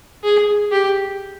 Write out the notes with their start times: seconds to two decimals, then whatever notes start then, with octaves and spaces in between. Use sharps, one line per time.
0.24 G#4
0.72 G4